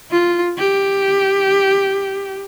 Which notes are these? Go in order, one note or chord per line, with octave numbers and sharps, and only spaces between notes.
F4
G4